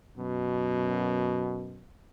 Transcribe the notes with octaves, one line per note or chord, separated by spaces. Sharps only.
F#2 B2